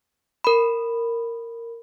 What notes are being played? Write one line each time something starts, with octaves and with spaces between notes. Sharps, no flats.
A#4 B5